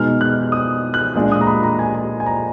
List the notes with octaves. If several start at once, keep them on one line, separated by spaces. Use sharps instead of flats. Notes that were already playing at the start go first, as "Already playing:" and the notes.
Already playing: B2 G#3 D#4 F6
F#6
D#6
F#6
A#2 G#3 D4
D#6
A#5
B5
A#5
G#5
G#5
G#5
A#5